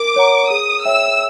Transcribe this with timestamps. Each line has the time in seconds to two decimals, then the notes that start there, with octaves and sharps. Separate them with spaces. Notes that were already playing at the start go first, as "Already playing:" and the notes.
Already playing: A#4 D6
0.16 C#5 F#5 A#5
0.50 G#4 D#6
0.85 C#5 E5 G5 E6